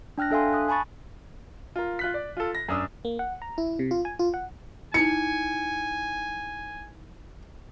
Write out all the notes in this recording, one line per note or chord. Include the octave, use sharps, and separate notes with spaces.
D4 G5 F6 F#6 A#6
D4 A4 E5 F5 G#5 C6
D#6 F#6
G#5 A5 B5 C#6 A6
F4 A#4
F4 F#6 B6
D5
F4 A4
A#6
F#2 D4 D#6 E6
A#3
F#5
A#5
E4
C3
F4
G#5
F4
F#5
D#4 E4 G#5 C#7